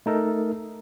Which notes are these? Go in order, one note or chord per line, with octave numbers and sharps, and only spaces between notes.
A3 D#4 A4 A#4